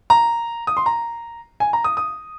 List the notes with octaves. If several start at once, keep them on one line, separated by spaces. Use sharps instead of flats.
A#5
D#6
C6
A#5
G#5
A#5
D#6
D#6